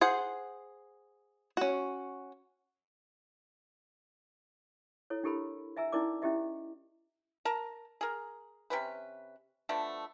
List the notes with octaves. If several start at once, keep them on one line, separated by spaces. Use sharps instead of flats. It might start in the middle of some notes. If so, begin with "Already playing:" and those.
G#4 C5 F#5
C#4 F#4
E4 A4 C#5
D4 E4 G4 A4 A#4 B5
D#5 E5 G#5 A#5 E6
C#4 D#4 E4 A#4 D5 D6
C#4 E4 G4 D#5 E5
A#4 A5 A#5
G#4 A#4
C3 C#4 B4
F3 A3 B3 D4